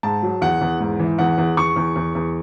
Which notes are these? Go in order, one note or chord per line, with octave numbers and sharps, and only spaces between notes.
G#2 A5
F#3
E2 F#5
E2
G#2
E3
E2 F#5
E2
E2 C#6
E2
E2
E2